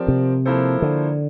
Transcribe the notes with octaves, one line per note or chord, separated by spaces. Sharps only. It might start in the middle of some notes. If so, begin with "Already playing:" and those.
Already playing: F3 C4 G4 A#4 D5
C3
F3 A#3 E4 A4 C5
D3